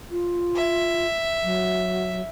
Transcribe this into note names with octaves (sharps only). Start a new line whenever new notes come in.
F4
E5
F#3